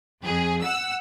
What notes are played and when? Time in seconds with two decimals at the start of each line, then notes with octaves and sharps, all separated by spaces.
0.22 F2 G#4
0.62 F#5 E6